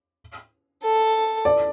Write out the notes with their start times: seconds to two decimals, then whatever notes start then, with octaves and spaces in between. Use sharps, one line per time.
0.83 A4
1.45 D5